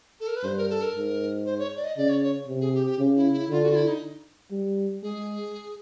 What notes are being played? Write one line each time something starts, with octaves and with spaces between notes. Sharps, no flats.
A4
A#4
B4
G2 C5
A#4
A4
A#4
G#2
C5
C#5
D5
D#5
C#3 D5
C#5
C#5
C3
G#4
G4
G4
C#3
E4
E4
D3 F4
F#4
F4
E4
D#4
G3
G#3 G#4